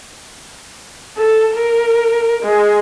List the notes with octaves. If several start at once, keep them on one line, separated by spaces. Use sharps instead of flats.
A4
A#4
G#3